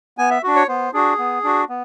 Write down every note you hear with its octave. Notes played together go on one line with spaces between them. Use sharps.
B3 G#5
E5
D4 F#4
C#5
B3 C5
D4 F#4 G#4
B3
D4 F#4
B3